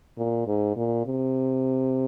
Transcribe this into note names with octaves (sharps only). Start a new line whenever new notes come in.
A#2
G#2
A#2
C3